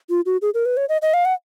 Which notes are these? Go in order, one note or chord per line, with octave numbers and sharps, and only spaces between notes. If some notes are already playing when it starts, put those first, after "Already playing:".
F4
F#4
G#4
A#4
B4
C#5
D#5
D#5
F5
F#5